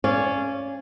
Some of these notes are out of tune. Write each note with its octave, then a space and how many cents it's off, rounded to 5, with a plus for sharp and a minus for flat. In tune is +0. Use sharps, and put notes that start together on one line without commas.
C#4 -5 D5 -20 F5 -20